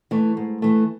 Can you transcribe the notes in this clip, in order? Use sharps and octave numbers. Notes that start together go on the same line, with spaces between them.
E3 A3
G#2
E3 A3